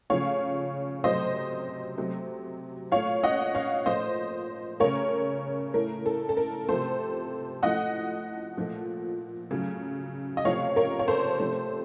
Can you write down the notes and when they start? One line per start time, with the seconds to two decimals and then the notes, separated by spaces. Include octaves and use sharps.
0.10 C#3 F3 A3 C#5 F5
1.04 C3 F#3 A3 C5 D#5
1.98 C3 F#3 A3
2.92 A#2 A3 C#5 F5
3.24 D#5 F#5
3.55 C#5 F5
3.86 A#2 F3 A3 C5 D#5
4.80 C#3 A3 A#4 C#5
5.74 A2 A3 A#4
6.06 A4
6.29 A4
6.37 A#4
6.68 C3 F3 A3 A4 C5
7.62 A2 F3 A3 D#5 F#5
8.57 A#2 F3 A3
9.51 C#3 F#3 A3
10.37 D#5
10.45 C3 F3 A3 C#5 F5
10.76 A#4 C#5
10.99 C#5
11.08 A4 C5
11.39 C3 F3 A3